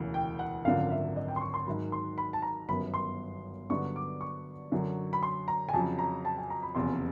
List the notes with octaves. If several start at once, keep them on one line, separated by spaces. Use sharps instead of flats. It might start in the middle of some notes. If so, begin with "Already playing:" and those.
Already playing: E1 D2 C#3 E3
G5
F#5
G#1 F#2 D3 F3 F5
E5
D#5
G5
C6
C#6
C6
G#2 D#3 F#3 B5
C6
B5
A5
A#5
G1 F#2 D#3 F#3 B3 B5
C6
G2 D3 F#3 B3 D4 C#6
D6
C#6
F#2 D3 F#3
B5
C6
A#5
G#5
F2 C#3 F#3 A5
A#5
A5
G#5
A#5
B5
F1 E2 C#3 C6